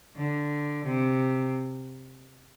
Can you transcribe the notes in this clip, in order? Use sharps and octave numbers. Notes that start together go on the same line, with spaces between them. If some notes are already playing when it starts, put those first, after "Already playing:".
D3
C3